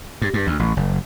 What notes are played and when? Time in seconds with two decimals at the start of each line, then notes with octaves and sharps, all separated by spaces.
0.22 G2
0.34 G2
0.47 D2
0.59 A1
0.77 F#1